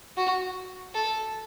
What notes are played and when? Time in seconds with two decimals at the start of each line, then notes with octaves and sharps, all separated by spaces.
0.17 F#4
0.94 A4